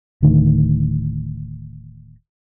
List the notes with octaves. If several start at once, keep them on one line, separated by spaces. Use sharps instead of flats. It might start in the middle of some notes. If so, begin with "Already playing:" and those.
D1 D2 D#3